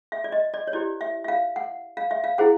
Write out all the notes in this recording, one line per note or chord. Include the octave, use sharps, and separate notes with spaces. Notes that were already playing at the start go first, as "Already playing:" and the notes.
E5
D5
D#5
D5
C#5
E4 G4 C5 D5
E5
E5
F5
F#5
F5
E5
F5
E4 G#4 C5 F#5